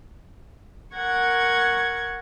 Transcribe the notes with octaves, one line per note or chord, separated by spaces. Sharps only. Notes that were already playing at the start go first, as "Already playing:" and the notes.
A#4 F#5 C#6 G#6